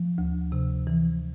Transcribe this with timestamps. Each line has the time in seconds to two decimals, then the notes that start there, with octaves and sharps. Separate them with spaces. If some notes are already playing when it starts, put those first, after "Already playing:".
Already playing: F3
0.18 D2
0.52 C3
0.87 E3